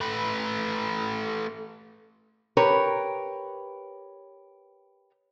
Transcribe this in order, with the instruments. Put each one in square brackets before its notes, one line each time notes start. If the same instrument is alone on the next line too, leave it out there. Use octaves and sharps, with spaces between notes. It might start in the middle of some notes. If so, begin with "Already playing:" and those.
[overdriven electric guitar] A3 B4
[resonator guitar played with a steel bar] G4 A#4 B4 C#5